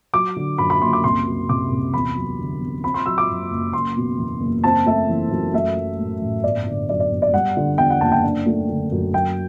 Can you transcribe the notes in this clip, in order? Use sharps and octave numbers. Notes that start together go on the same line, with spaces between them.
F#3 D6
D3
F#2 B5
B5
F#1 C6
D6
C2 C6
F#3
C3 D6
C2
E2 B5
F#3
D3
E2
C4 B5
C6
F#3 E6
D6
F#2
F#1
F#1 C6
B2
E2
F#1
C4 A5
A3 E5
E3
F#2
A3 E5
F#3
A2
A1
G1 D5
D3
F#2 D5
D5
G1
D5
G3 F#5
D3
E2 G5
F#5
F#1 A5
G5
D4
A3
D3
F#2
F#3 G5